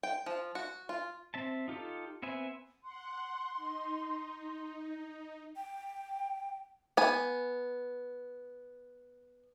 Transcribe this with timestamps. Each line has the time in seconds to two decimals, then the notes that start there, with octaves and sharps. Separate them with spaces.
0.03 G5
0.26 F3
0.55 F#4
0.89 F4
1.34 C4 E5 A5
1.68 D#4 F4 G4 A4
2.23 B3 C4 E5 G#5
2.82 F#5 C6
3.57 D#4
5.56 G5
6.97 B3 G#5